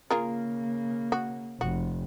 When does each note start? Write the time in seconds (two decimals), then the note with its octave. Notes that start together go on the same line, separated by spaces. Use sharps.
0.11 C#3 A#3 F4 G#4 A#4
1.12 F#4
1.61 F1 F#4